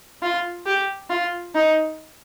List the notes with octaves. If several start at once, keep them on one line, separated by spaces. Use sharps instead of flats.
F4
G4
F4
D#4